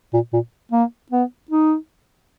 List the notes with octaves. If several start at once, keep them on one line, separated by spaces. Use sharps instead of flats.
A#2
A#2
A#3
B3
D#4